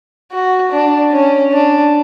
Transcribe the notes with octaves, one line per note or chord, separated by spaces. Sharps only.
F#4
D4
C#4
D4